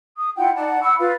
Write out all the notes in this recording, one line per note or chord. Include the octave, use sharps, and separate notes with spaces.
D#6
E4 F4 F#5 G5
D#4 D5 F#5 A5
F#5 B5 C#6 E6
F4 B4 F5